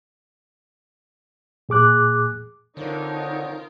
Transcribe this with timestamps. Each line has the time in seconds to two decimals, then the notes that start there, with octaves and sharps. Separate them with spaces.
1.69 A#2 G#4 D6 F#6
2.77 D3 C4 D#4 F4 A4 A#4 C#5